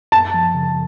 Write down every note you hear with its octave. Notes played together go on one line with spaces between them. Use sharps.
F#2 A5
F3
C#3